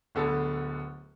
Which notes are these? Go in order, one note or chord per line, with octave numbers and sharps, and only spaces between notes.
D1 D3 B3 A4